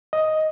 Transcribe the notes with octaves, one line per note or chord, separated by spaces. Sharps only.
D#5